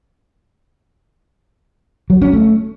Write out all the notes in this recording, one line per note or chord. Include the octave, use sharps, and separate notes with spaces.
F#3
C#4
A3